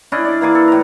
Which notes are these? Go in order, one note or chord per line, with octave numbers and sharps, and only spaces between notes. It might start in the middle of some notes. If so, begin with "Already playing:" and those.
C#4 D4 E4 D#5
D5
E3 A#3 G#4 D6
A4
A2 A#5